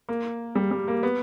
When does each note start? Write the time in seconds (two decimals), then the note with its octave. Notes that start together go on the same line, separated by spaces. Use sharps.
0.09 A#3
0.55 G3
0.71 G3
0.88 A#3
1.03 B3